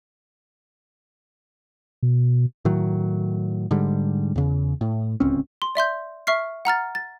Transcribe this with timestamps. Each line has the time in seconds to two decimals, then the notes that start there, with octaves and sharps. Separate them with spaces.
2.03 B2
2.65 A2 D#3 F#3
3.71 G#2 D3 G3
4.36 E2 C#3
4.81 A2
5.20 D1 C#2 C4 C#4
5.62 C6
5.75 D5 E5 C6 G6
6.27 E5 C#6 F6 C7
6.65 F#5 A#5 F6 A6
6.95 A6